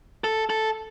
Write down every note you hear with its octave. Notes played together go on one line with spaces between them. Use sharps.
A4
A4